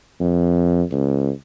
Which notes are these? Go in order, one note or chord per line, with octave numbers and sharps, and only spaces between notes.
F2
C#2